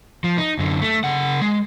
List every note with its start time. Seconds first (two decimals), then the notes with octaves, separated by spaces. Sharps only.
0.24 F3
0.38 D#4
0.59 F#2 D3
0.81 A3
1.04 C#3 F#5
1.41 G#3